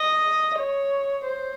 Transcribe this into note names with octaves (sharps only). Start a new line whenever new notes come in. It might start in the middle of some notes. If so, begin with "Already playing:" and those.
Already playing: D#5
C#5
C5